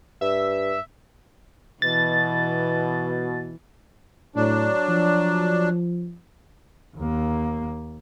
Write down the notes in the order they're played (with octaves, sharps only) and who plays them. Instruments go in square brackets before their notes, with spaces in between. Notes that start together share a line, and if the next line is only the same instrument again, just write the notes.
[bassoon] G2 [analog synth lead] E5
[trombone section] B2 [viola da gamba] E3 [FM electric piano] A6
[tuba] A2 [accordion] F#3 D4
[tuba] F3
[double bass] D#2 A#3